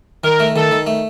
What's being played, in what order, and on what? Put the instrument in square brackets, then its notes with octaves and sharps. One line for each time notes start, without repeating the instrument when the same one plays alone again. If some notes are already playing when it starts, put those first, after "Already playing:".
[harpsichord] D#3 [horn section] A#4
[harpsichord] A3
[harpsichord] D#3 [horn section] A4
[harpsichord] D#3
A3